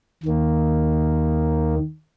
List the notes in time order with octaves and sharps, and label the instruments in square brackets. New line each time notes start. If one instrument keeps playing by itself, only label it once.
[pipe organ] D#2 D#3 A#3